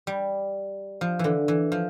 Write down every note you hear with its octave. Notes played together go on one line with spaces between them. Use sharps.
G3
F3
D3 E3
E3
F3